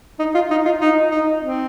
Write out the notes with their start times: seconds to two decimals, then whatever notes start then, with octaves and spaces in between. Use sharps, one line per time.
0.19 D#4
0.35 F4
0.51 D#4
0.66 F4
0.81 D#4
1.11 D#4
1.42 C4